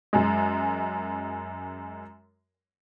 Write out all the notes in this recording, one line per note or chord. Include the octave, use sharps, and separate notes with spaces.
F#2 G#3